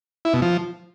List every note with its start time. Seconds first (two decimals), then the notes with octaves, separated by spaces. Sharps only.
0.25 E4
0.34 B2
0.42 F3